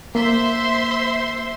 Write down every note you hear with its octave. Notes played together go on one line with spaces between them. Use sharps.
A#3 C5 E5 C6